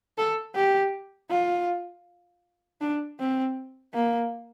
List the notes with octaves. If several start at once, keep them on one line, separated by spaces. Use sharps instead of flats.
A4
G4
F4
D4
C4
A#3